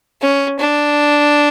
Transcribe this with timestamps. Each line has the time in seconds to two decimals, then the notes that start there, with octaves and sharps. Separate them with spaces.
0.21 C#4
0.59 D4